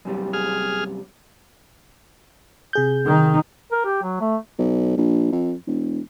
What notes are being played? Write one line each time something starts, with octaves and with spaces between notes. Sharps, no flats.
F#2 C3 G3
G#4 F6
C3 G#4 G6
D#3 D#4
A#4
G4
F#3
A3
B1
A#1
F2
E1